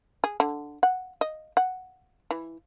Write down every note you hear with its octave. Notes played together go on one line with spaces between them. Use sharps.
G#4
D3
F#5
D#5
F#5
E3